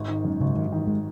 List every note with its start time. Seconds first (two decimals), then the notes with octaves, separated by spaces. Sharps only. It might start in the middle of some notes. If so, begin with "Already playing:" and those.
Already playing: G#1 G#2
0.08 D#3
0.24 F#2
0.41 G#1 C#3
0.55 G#1 D#3
0.72 D#3 E3
0.87 G#3